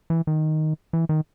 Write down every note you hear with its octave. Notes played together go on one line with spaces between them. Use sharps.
E3
D#3
E3
D#3